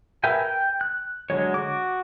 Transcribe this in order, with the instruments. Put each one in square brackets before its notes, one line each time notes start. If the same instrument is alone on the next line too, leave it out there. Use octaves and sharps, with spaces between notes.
[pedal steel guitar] A#4 B4 E5 G5 G#5
G5
F#6
D3 F#3 G#3 C#5
F#4 D6